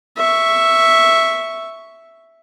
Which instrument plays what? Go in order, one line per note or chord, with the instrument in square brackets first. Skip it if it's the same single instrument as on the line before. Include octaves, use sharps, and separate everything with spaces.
[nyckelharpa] E5 C#6